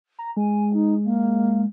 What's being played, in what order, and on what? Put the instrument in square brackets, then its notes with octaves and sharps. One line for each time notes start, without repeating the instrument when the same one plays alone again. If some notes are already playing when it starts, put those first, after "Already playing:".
[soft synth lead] A#5
[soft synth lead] G#3 [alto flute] G#5
[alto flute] D#4
A#3